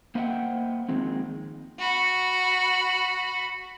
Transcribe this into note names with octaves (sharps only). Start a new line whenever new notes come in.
A#3 C5 D#5 E5 F#5 G5
D#3 F3 G#3 C4
F#4 B5